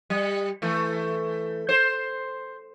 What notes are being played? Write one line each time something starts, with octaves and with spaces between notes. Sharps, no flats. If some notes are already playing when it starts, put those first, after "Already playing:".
G3
E3 A3
C5